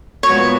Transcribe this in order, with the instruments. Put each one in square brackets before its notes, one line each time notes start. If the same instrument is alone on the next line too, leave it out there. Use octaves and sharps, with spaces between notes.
[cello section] A#2 G#3 B3 F#4 [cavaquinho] C#5